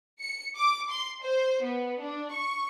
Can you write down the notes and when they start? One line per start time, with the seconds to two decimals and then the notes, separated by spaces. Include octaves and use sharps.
0.20 C#7
0.56 D6
0.90 C6
1.22 C5
1.63 B3
2.00 D4
2.32 C#6